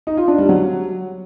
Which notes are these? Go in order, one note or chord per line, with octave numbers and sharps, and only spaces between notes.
D#4
F4
D4
G3
F#3